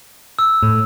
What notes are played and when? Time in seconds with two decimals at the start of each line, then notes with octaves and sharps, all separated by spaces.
0.39 E6
0.63 A2